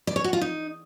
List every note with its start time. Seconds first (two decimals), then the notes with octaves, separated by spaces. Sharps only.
0.07 D5
0.16 C#5
0.24 F#4
0.33 F4
0.41 D#4